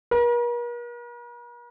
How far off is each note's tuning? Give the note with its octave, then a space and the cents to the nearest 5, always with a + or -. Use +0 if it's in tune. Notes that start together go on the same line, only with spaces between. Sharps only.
A#4 +45